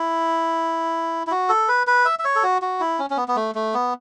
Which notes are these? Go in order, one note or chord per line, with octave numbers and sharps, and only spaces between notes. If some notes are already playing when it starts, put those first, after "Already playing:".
Already playing: E4
E4
F#4
A4
B4
B4
E5
E5
C#5
A4
F#4
F#4
E4
C#4
C#4
B3
B3
A3
A3
B3